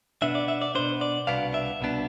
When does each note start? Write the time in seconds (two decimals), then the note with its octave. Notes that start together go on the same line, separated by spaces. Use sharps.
0.22 B2 B3 D4 E5
0.35 D5
0.48 E5
0.62 D5
0.75 B2 B3 D4 C5
1.01 D5
1.27 C2 B2 B3 D4 F5
1.54 E5
1.81 C2 B2 B3 D4